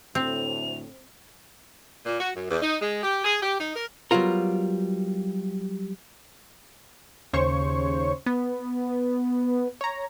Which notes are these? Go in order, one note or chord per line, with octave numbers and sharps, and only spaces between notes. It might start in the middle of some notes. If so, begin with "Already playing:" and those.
D2 A2 C4 F7
A#2
F#4
F#2
E2
D#4
G#3
G4
G#4
G4
D#4
A#4
F#3 G3 B3 F4 A#4
D#2 C#3 C5 C#5 C#6
B3
C#5 A#5